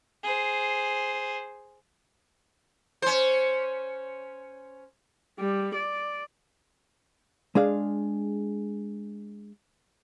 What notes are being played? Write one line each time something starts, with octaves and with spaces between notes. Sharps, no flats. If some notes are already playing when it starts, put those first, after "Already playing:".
G#4 C5
C#4 C5
G3
D5
G#3 D4 G#4 F5